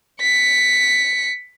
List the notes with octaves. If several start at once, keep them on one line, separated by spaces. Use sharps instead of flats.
B6 C#7